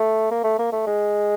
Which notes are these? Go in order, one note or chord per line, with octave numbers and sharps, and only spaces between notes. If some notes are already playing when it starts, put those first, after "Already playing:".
Already playing: A3
A#3
A3
A#3
A3
G#3